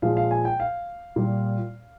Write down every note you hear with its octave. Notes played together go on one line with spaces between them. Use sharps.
A#2 F3 G#3 F5
F5
G#5
G5
F5
A#2 G3